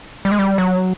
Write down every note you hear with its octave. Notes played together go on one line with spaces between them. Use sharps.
G3
G#3
G3
F#3